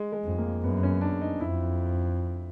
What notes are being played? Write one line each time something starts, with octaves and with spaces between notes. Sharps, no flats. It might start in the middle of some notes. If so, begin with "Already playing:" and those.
Already playing: G#3
G#3
F2
A#3
F#2 B3
C#4
D4
D#4
F2 E4